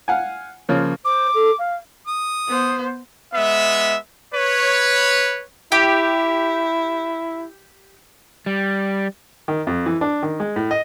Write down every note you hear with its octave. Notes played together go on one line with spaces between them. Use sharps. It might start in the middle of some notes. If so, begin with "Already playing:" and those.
F5 F#5 G#5
C#3 F3 A#3 F4 C#5
C5 D6
A4
F5
D#6
B3 C5
G#3 B3 E5
B4 C#5
E4 G4
G3
D#3
F2
E3
D4
D#3
G#3
A2
D#5